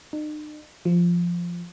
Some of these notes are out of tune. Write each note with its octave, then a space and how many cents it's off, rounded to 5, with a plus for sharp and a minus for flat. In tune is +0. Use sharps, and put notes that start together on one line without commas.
D#4 -45
F3 -5